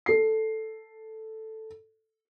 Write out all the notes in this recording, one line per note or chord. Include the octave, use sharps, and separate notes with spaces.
A4 C7